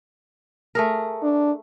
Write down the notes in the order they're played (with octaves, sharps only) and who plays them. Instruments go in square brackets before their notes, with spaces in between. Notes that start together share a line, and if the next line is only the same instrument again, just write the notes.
[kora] A3 G#4 A#4
[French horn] D4